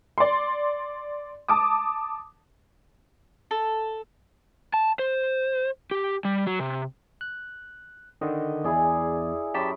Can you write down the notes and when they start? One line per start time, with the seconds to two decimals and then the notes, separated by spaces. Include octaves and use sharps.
0.18 D5 C6
1.48 A5 D6 D#6
3.51 A4
4.74 A5
4.99 C5
5.91 G4
6.25 G3
6.47 F#3
6.60 C3
7.21 F#6
8.21 D3 D#3 D#5
8.64 E2 E4 G#4 D5
9.54 F#2 G4 A5 B5 D6 B6